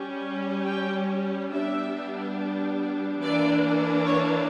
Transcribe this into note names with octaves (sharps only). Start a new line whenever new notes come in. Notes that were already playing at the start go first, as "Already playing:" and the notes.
Already playing: G3 C#4
G5
G3 B3 D4 E5
E3 A#3 D4 D5
C#5